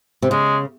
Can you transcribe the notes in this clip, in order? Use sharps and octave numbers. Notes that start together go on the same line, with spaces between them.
C3
C#3 G#3